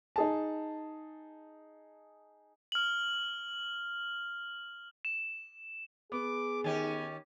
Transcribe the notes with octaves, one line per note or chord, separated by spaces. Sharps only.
D#4 G#4 A5
F6 F#7
E7
B3 G#4 D6
D#3 C#4 G4 G#5